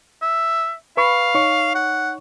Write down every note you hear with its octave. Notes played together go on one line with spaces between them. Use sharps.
E5
B4 F5 B5 C#6
D#4 C#5 C#6
F#5